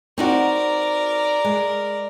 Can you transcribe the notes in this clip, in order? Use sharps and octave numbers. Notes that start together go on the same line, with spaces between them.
C4 D#4 F#4 A#4 D5
G#3